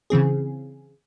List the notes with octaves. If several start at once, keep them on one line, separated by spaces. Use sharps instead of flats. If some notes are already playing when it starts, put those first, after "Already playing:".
C#3 E3 C4 G#4